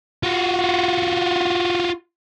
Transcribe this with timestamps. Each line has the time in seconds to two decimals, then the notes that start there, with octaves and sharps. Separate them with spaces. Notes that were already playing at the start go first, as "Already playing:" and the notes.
0.23 F4 F#4